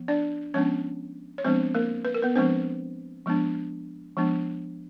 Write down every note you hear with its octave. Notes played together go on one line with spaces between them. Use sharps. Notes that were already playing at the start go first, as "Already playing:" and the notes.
Already playing: F3 B3
D4 D5
F3 G#3 B3 C#4 D4 C#5
C#5
F3 G#3 B3 C4 D4 C5
A#3 A#4
B4
A#4
B3 B4
F3 G#3 B3 C4 D4 C5
F3 G#3 B3 D4
F3 G#3 B3 D4